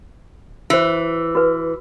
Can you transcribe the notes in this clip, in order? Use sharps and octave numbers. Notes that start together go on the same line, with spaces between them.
E3 F#4 C5
F#4 B4